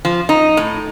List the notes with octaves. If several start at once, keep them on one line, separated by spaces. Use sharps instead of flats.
F3
D#4
A2